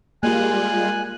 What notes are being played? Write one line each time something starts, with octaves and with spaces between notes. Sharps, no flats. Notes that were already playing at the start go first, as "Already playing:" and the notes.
G3 G#3 A#3 F4 G#5 F#6